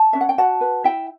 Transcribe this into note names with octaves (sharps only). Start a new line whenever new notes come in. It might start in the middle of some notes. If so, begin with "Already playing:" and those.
Already playing: A5
C#4 E5
F#5
G5
F#4 F#5 A5
B4
E4 E5 G5